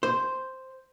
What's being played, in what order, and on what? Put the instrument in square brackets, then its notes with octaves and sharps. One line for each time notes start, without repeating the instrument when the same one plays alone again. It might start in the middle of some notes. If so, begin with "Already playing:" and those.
[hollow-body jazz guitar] C5